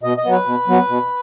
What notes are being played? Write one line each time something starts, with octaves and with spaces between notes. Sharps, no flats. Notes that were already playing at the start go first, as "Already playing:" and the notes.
B2 D#5
D#5
F#3 B3
B4
B2
F#3 B3
B2